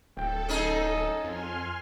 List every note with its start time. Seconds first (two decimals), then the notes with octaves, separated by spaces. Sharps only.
0.17 D1 A4 G5
0.49 C#4 D#4 G#4 D#5
1.24 F2 G#5 C6 F6